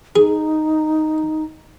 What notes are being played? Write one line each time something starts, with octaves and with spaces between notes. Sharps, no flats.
D#4 G#4